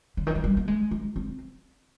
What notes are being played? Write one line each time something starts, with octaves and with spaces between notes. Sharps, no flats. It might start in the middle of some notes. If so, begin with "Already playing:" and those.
D3
D#3
F3
G3
A#3
G#3
G#3
C4